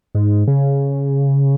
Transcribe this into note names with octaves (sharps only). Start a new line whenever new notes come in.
G#2
C#3